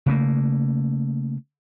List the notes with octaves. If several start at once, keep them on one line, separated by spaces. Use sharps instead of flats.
C#3 A3 A#3